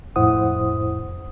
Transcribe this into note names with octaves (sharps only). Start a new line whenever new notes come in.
F2 A2 E4 C5 F#5 D#6